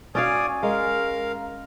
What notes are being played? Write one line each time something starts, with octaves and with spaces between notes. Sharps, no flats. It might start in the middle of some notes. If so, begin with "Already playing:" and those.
C#4 F#4 D5 F5 G#5 D#6
G#3 A#4 F5